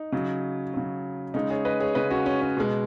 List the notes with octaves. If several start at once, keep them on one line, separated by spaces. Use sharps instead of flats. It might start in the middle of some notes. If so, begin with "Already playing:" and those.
Already playing: D#4
C#3 F#3
C#3 F#3
C#3 G#3 D#4
G#4 C#5
B4 D#5
G#4 C#5
C#3 G#3 B4 D#5
C#4 F#4
C#4
C#4
B2 G#3